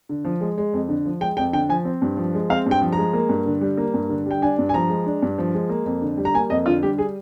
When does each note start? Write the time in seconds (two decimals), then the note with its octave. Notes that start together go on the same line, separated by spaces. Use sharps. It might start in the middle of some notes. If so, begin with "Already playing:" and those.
0.09 D3
0.25 F3
0.41 G#3
0.57 G#3
0.73 F2
0.89 D3
1.06 F3
1.21 G#3 G5
1.37 F2 G5
1.53 D3 G5
1.69 F3 G#5
1.85 C4
2.02 G2
2.17 F3
2.34 G#3
2.50 C4 F5
2.66 G2
2.71 G5
2.82 F3
2.93 G#3 A#5
3.13 A#3
3.29 G2
3.46 D3
3.61 G3
3.77 A#3
3.94 G2
4.09 D3
4.26 G3 G5
4.42 D4 G#5
4.58 G2
4.69 G#5
4.74 F3 A#5
4.89 G#3
5.06 D4
5.22 G2
5.38 F3
5.54 G#3
5.69 A#3
5.86 F2
6.02 D3
6.18 G3
6.25 A#5
6.34 A#3 G#5
6.50 F2 D#5
6.66 D3 F4
6.83 G3 G4
6.98 G#4